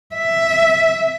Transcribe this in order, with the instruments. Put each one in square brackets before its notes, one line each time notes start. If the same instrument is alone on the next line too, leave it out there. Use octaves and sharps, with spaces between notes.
[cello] E5